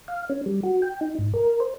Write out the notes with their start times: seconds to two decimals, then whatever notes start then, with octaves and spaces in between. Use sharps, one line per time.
0.08 F5
0.29 C#4
0.46 G3
0.63 F#4
0.82 G5
1.01 D#4
1.19 G#2
1.34 A#4
1.60 C5